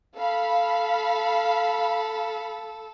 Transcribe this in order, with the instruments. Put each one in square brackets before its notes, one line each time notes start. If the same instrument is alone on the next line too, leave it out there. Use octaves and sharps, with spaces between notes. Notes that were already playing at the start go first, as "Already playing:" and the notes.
[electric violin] A4 [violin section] F5 B5